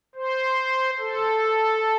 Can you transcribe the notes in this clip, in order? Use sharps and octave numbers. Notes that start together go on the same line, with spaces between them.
C5
A4